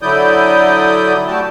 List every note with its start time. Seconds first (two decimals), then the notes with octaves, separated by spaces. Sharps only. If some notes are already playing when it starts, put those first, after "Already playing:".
0.02 D3 F#3 E4 D5 D#6 G6
1.27 A3 F#4 G4 D5 A5